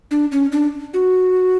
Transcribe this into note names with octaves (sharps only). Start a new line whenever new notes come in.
D4
C#4
D4
F#4